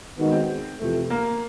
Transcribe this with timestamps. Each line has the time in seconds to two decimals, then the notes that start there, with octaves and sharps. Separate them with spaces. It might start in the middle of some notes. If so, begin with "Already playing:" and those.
0.17 D#3 G#3 B3 D#4 F#4
0.31 C4
0.79 F2 C3 E3 A3
1.10 A#3